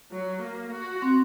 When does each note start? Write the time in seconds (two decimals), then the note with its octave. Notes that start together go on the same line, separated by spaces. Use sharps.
0.11 F#3
0.41 A#3
0.72 F#4
1.02 C4